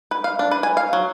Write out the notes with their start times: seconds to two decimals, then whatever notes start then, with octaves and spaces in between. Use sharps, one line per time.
0.11 B4
0.24 F5
0.39 D4
0.51 B4
0.63 G#5
0.77 F5
0.93 F#3